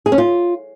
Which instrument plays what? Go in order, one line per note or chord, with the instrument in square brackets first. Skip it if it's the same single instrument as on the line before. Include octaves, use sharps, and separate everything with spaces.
[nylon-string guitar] G#4
C#4
F4